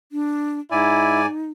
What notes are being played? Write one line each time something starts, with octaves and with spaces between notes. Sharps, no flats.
D4
G#2 D#4 E4 D5 G#5